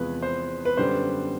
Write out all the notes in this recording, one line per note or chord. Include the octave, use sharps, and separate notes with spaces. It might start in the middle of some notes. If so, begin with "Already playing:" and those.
Already playing: E2 C3 F3 G#3 B4
C5
B4
F#2 D3 G3 B3 C5